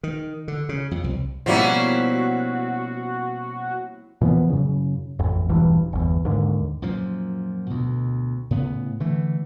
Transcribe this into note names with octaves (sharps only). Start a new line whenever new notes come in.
D#3
D3
C#3
F2
C2
B2 F3 G3 A#3 C4 C#4 E4 F#4
A#2 E3 F3 B3
F#2 C#3
A1 F2
E1 A#1 G2 E3
G1 E2
D#2 G#2 D3
F#2 A#2 F3
D2 B2
A2 C#3 B3
D3 E3 A3